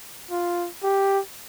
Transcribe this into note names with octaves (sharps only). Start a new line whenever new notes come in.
F4
G4